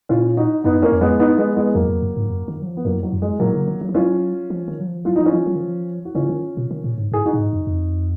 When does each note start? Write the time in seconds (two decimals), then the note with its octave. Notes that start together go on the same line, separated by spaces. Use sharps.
0.09 A#2 C#4 F4
0.37 D#4 F#4
0.64 F#2 B3 D#4
0.82 A#3 C#4
0.92 F2
1.01 G#3 B3
1.20 B3 D#4
1.38 G#3 B3
1.57 G#3 B3
1.74 F2 F#3 A#3
1.88 F2
2.02 F#2
2.16 G#2
2.30 F#2
2.48 D#3
2.62 F#3
2.66 F3
2.77 B3
2.85 F#2 F#3 A#3
3.03 F#3
3.12 F#2
3.22 G#3
3.40 A#2 F#3 A#3
3.54 C#3
3.68 D#3
3.81 F#3
3.89 F3
3.94 F#3 C#4 F4
4.50 F3
4.68 D#3
4.80 F#3
4.87 F3
5.05 F#3 F4
5.16 F3 D#4
5.26 C#4 F4
5.33 F3
5.47 F#3
5.56 D#3
5.61 F3
6.05 F#4
6.15 C#3 C#4 F4
6.29 D#3
6.57 B2
6.71 D#3
6.84 A#2
6.98 G#2
7.12 G#2 G#4
7.26 D#4 F#4
7.33 A#2
7.39 G#2
7.53 F#2
7.67 F2